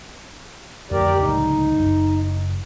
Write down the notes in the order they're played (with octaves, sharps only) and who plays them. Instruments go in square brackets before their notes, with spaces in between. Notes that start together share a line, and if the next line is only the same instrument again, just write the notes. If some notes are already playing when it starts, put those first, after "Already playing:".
[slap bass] F2 D3 A3 [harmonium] G4 A#4 D5
[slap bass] D1 C#2 F#3 [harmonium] D#4
[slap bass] F#1